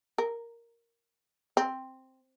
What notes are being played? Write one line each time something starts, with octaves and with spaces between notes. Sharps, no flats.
A#4
C4